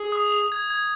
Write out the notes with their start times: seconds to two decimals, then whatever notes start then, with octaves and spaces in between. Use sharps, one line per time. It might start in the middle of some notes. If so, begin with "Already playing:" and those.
Already playing: G#4
0.12 D#6
0.31 F7
0.52 G#6
0.70 G#6